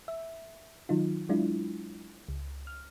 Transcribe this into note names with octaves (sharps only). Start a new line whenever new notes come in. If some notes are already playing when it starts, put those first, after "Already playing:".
E5
D#3 F#3 D#4 F4
F#3 G#3 D4 E4 F4
C#2
F6